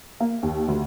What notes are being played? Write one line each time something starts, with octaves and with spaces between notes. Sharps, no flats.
A#3
D#2
D2